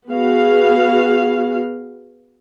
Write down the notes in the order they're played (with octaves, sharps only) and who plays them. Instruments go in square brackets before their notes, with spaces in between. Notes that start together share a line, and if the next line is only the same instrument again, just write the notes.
[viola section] B3 F#4 G#4 F5